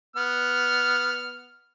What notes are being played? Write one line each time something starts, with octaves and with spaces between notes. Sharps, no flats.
B3 F6